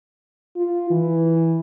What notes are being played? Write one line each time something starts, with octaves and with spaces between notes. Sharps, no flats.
F4
E3